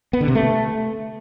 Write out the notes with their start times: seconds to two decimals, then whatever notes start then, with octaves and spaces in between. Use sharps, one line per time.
0.13 B3
0.21 D3
0.28 C3
0.35 A3